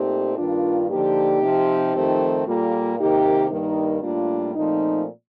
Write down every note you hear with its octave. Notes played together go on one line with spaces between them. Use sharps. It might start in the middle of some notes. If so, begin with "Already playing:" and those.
Already playing: A#2 A3 C4 D#4 G4
G2 D#3 A#3 D4 F4
D3 F3 A#3 D#4 G4
C3 F3 C4
F2 D#3 A3 C4
A#2 G3 A#3 F4 A4
C3 D#3 A#3 D#4 G4
G2 D#3 G3 A#3 D#4
A2 G3 A#3 D4 F4
A#2 F3 A3 C4 D#4